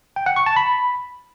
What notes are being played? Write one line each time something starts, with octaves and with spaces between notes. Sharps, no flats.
G5
F#5
C#6
A5
B5